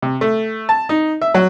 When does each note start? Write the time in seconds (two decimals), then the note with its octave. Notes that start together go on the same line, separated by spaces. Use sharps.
0.02 C3
0.21 A3
0.69 A5
0.89 D#4
1.22 E5
1.34 F#3